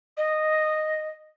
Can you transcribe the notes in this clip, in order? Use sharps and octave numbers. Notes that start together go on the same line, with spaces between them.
D#5